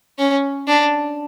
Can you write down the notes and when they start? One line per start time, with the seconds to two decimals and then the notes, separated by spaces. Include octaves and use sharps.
0.19 C#4
0.68 D4